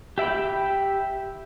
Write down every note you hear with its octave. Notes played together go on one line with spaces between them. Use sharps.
G4 E5 G5 B5